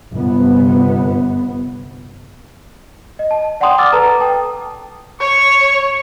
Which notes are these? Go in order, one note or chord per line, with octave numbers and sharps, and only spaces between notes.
G1 C3 B3
D#5
A5
D5 F#5 G5 A5 C6 D#6
D6 E6 F6 A6
A4 B4 A5 A#5
G5 A5 D#6
C#5 C#6